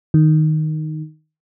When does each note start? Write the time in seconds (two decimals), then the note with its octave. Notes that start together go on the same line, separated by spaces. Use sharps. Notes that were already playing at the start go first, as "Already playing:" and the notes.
0.14 D#3